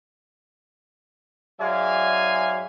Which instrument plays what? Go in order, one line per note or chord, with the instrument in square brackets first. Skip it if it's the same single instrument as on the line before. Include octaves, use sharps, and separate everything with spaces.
[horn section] G#2 F#3 D5 E5 F5 G#5